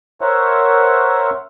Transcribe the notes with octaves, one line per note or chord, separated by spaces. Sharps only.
A#4 C5 C#5 E5 F#5